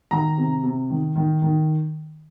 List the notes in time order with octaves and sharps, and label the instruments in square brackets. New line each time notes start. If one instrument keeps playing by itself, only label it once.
[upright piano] D#3 A#5
C3
C3
D#3
D#3
D#3